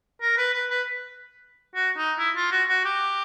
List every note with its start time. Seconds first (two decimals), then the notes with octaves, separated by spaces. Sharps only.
0.21 A#4
0.38 B4
0.53 B4
0.70 B4
1.75 F#4
1.97 D#4
2.19 E4
2.36 F4
2.52 F#4
2.68 F#4
2.85 G4